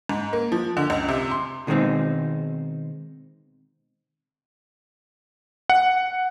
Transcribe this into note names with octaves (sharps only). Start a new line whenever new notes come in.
G#2
A#3
F3
D3
C#2
C3
C6
B2 D#3 G#3 A#3 C4 D#4
F#5